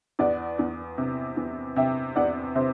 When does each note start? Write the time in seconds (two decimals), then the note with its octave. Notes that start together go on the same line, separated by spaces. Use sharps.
0.19 E2 D5 F#5
0.59 E2
0.98 C3
1.37 E2
1.76 C3 E5 G5
2.16 E2 D5 F#5
2.55 C3 C5 E5